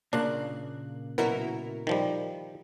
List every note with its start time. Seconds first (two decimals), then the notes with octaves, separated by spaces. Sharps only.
0.13 A#2 C#3 A#3 D4 F#6
1.18 B2 F#3 E4 F#4 A#4
1.87 D#3 F3 G3